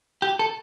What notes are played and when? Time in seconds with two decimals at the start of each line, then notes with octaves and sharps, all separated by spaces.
0.22 G4
0.39 A4